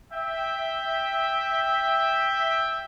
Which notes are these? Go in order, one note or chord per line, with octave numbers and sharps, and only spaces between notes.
E5 G5